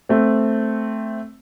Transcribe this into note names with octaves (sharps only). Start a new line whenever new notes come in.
A3 C4